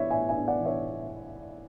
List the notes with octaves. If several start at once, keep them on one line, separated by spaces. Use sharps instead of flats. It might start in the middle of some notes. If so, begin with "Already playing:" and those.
Already playing: E3 B3 B4 C#5 D5 E5
A2 E5 G#5
E5 G#5
D4
D5 F#5
E3
C#5 E5